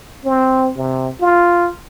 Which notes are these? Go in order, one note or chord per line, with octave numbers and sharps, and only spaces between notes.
C4
C3
F4